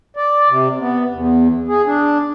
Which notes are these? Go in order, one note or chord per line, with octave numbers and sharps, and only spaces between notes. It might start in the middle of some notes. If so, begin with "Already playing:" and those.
D5
C3
B3
E2
G#4
D4